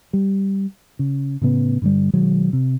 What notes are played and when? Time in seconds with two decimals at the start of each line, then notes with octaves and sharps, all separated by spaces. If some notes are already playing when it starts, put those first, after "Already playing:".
0.13 G3
0.99 C#3
1.41 A2 C#3 B3
1.82 G2 D3 G3
2.13 B2 D#3 F#3 G#3
2.53 C3